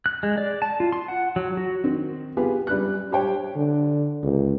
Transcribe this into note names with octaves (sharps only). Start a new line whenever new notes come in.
F#6
G#3
D5
A5
F4
C6
F#5
F#3
F#4
D#3 C4
B3 F4 G4 G#4 B4
F#2 G3 B4 F#6
G3 D4 G4 C5 C#5 G5
D3
C#2